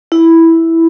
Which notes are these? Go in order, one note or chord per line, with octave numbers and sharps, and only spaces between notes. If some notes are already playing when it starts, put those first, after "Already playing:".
E4